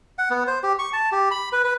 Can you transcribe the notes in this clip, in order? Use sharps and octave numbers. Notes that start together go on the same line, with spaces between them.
F#5
B3
C5
G4
C#6
A5
G4
B5
B4
B4